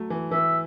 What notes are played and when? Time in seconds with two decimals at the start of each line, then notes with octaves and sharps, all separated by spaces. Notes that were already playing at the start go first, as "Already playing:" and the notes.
Already playing: F#3 A3
0.10 E3
0.31 E3 E5